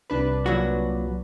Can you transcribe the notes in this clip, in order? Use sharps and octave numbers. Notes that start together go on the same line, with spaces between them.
C2 D4 B4
A#2 F#3 F#4